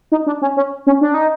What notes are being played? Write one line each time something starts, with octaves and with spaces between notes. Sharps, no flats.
D#4
D4
C#4
C#4
C#4
D4
D#4